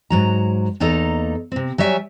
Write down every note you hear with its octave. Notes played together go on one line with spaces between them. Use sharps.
G#2 F#3 A#5
E2 A#3 D#4 A4 D#5 A#5
C3 C4
F#3 G3 C#5 E5 G#5